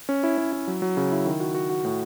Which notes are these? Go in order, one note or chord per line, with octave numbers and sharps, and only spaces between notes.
C#4
E4
C#4
E4
F#3
F#3
C#3
E4
D#3
F#4
F#4
F#4
A2